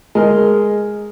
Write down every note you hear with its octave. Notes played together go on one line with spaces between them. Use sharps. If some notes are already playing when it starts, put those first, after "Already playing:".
G#3 A#4